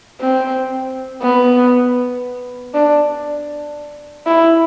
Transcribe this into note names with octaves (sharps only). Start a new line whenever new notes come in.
C4
B3
D4
E4